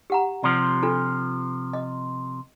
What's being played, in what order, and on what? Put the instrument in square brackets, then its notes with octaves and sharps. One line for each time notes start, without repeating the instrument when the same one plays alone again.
[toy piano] G4 F#5 A#5
[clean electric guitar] C3 F3 [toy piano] D5
[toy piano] D4 F4 A4
D#5